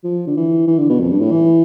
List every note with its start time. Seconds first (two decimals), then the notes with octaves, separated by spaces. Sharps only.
0.04 F3
0.27 D3
0.37 E3
0.67 E3
0.78 D3
0.90 B2
1.00 F2
1.11 G2
1.21 A2
1.31 E3